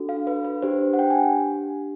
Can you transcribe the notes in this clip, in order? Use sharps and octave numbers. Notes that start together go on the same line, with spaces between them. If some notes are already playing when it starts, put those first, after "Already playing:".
Already playing: D4 F#4 A4
F5
B4
B4
D4 G4 C5
F#5
G5
G#5